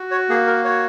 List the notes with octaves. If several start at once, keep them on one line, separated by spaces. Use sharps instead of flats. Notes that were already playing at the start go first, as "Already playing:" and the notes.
Already playing: F#4
C#5
A#3 G#4
A#4
F#4 C#5